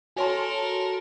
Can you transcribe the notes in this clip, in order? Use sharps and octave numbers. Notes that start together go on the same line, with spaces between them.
F#4 A4 A#4 C#5 G#5 A5 C6